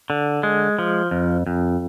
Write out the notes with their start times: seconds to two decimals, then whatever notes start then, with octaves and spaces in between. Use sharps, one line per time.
0.10 D3
0.43 G#3
0.79 F3
1.11 F2
1.47 F2